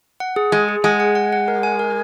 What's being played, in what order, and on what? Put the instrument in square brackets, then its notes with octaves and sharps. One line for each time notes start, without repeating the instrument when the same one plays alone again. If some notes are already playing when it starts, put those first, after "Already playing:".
[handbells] F#5
G#4
[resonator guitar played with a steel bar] G#3 [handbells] G#4
[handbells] G#4
[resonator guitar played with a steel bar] G#3 [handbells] F#5
[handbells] F#5
F#5
F#5
A#4
G#5
A#4